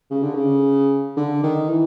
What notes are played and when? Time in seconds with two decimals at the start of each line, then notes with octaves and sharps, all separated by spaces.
0.11 C#3
0.23 D3
0.35 C#3
1.17 D3
1.44 D#3
1.70 E3